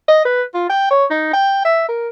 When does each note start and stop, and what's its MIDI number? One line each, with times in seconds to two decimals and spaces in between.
0.08 0.21 75
0.25 0.43 71
0.54 0.67 65
0.69 0.89 79
0.90 1.05 73
1.10 1.30 63
1.33 1.62 79
1.65 1.86 76
1.89 2.09 70